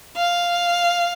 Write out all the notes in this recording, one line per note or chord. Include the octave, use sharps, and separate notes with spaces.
F5